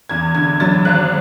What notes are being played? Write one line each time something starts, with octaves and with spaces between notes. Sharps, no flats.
E2 G#6
D3 G#6
F#3 A6
G#1 F#6